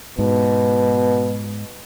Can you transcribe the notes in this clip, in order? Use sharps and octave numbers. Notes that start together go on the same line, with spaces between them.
G#2 B2